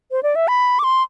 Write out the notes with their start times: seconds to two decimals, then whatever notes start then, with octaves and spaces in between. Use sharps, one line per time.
0.11 C5
0.23 D5
0.36 E5
0.48 B5
0.79 D6
0.84 C6